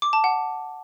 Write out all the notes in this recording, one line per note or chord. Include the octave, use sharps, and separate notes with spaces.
D6
A5
F#5